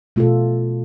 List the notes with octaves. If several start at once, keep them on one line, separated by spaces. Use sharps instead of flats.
B2 A3 F4 A4